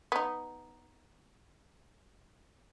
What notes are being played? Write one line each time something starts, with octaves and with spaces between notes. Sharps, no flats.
B3 D#4